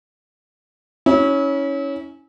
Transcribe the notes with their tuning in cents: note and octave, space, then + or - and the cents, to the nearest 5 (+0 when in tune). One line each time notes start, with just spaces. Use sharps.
C#4 +5 E4 -35